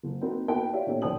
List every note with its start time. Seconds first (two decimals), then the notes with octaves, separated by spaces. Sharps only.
0.03 F#1
0.21 A#3 C4 D#4 F#4 A4 B4
0.48 A#3 B3 D#4 F#4 B4 G5
0.73 F4 G4 C#5 D5 E5 F5
0.87 A#2 B3 C#4 D#4 G4 A4
1.02 B1 C5 D5 G5 D#6 F#7